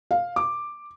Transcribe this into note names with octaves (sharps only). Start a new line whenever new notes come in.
F5
D6